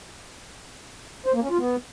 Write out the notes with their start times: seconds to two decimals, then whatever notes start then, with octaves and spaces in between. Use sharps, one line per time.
1.26 C5
1.34 A#3
1.42 C#4
1.50 F4
1.58 B3